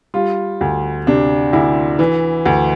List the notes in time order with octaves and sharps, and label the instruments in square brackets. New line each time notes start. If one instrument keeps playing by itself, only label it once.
[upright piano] G3 F4
D2
C3 D4
D2 E4
E3
D2